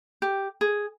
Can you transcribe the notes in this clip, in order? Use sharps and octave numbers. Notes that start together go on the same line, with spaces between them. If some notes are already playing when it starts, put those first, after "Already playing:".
G4
G#4